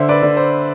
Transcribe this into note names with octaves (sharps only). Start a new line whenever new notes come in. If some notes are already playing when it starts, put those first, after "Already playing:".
Already playing: D3 C5 E5
B4 D5
D3
C5